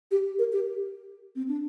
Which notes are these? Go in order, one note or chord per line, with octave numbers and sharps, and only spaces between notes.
G4
A#4
G4
C4
D4